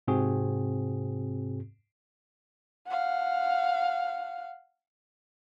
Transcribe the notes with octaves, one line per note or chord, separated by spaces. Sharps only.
G#2 C3 C4 F#4 G#4
F5 F#5